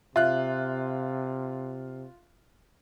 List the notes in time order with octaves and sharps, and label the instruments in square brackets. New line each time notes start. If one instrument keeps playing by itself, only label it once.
[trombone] C3 [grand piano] F4 F#6 [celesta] E5